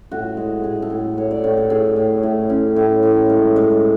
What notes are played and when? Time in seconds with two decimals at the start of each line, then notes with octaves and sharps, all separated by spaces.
0.11 A2 F#4
0.37 G#3
0.63 A2 G#4
0.82 A4
0.90 A2
1.17 A2 C#5
1.31 D5
1.44 A2 C#5
1.57 A4
1.70 A2 G#4
1.96 A2
2.23 A2
2.50 C#4
2.76 A2
3.03 A2
3.30 G#3
3.56 G#3